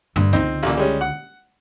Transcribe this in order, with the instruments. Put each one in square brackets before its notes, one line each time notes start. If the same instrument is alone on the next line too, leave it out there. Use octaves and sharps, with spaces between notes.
[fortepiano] D2 [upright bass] G2
[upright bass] C#2 D3 [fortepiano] C4 D#4
[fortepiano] A1 A#2
G3 G#3 C#4
F#5